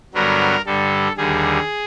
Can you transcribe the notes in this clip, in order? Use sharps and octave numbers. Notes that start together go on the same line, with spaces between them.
G2 D3 F#3 B3 A#4
G2 D3 G3 A4
D#2 D3 G3 G#4